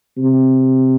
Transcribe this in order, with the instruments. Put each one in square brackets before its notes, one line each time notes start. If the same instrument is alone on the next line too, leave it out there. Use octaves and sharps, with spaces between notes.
[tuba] C3